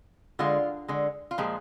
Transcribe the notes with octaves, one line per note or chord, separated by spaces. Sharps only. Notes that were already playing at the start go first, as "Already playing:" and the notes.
D3 G#3 F4
D3 G#3
F4
A#2 F3 G#3 G4